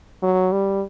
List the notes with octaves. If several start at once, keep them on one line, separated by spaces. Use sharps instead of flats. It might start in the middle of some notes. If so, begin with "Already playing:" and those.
F#3
G3